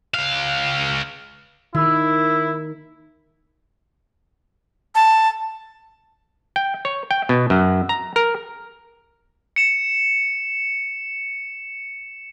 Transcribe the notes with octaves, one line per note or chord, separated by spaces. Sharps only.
C#2 F5
D#3 E4 E6
A5
G5
C#5
G5
B2
F#2
A#5
A#4
C#7 E7